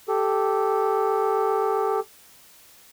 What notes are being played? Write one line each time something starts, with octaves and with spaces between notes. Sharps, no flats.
G4 A4